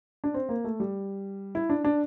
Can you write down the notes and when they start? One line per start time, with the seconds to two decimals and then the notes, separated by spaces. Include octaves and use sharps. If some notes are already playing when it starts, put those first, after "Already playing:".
0.24 D4
0.34 C4
0.49 A#3
0.64 A3
0.80 G3
1.55 E4
1.70 D4
1.84 D4